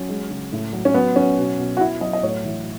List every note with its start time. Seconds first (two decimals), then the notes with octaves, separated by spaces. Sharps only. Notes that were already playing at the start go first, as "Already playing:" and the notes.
Already playing: F#3 C#4
0.09 G#3
0.30 C#3
0.52 A2
0.73 F#3
0.85 C#4
0.94 F#3 B3
1.16 F#3 C#4
1.38 B2
1.59 B2
1.77 F#4
1.80 B2 E4
2.01 F#3 D#5
2.13 D#5
2.23 A2 C#5
2.45 E3